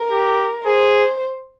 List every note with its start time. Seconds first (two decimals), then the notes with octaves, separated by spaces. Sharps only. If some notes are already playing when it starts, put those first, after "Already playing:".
Already playing: A#4
0.11 G4
0.65 G#4 C5